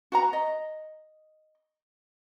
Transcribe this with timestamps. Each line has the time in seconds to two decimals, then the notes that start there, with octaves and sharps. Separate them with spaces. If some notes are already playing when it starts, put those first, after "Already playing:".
0.12 F#4 F#5 A#5
0.33 D#5